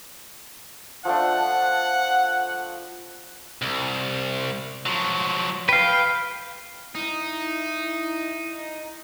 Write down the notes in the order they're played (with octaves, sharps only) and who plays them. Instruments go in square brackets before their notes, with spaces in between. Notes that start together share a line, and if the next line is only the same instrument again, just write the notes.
[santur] F3 A3 D4 [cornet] F#5
[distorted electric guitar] C2
F3 F#3
[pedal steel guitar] B4 F5 [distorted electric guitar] G5
[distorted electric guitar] D#4 [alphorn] E4